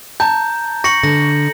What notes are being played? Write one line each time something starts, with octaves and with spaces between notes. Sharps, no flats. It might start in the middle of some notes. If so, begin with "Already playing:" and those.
A5 A#5 G6
C#6 A#6 C#7 F#7
D3 A#6